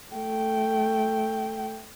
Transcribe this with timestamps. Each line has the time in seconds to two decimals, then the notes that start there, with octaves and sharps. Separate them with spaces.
0.13 A3 G5